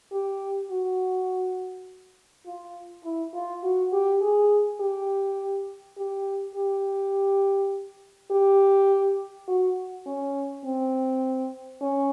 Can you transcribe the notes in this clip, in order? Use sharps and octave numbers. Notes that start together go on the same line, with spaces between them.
G4
F#4
F4
E4
F4
F#4
G4
G#4
G4
G4
G4
G4
F#4
C#4
C4
C#4